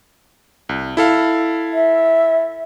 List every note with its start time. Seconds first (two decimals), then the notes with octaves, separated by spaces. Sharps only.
0.69 C2
0.97 E4 A4 F5
1.73 E5